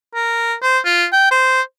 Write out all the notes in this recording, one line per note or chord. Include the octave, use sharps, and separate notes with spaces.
A#4
C5
F4
G5
C5